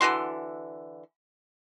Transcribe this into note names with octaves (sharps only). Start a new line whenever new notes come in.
D3 E3 F#4 C6